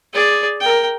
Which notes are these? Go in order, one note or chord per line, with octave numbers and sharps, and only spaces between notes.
G#4 D5
A#4 G5